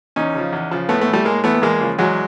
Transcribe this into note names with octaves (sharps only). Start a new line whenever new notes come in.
E2 C#4 D#4
C#3 F3
E2
C#3 F3
A2 A3 B3
A3 B3
E3
G3 A3
A2 G#3 A#3
E3 A3 B3
B3
E2 G#3 A#3
C#3 F3
E2 F#3 G#3